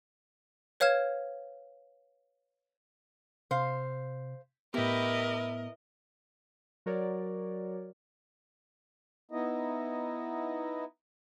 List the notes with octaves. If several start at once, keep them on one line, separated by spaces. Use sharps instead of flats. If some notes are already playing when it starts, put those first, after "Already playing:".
B4 C#5 F5 F6 G#6 E7
C3 C5 F5
A2 B3 E4 G4 A#4 B4 D#5
F#3 F#4 A#4 C#5 D5
B3 D#4 E4 D#5